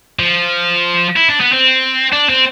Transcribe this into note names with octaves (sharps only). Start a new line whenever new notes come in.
F3
E4
D4
B3
C4
D4
C4